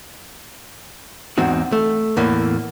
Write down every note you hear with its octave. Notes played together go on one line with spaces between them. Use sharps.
E2 G#2 C4 D#4 F#4
A3
E2 A2 E3 A#3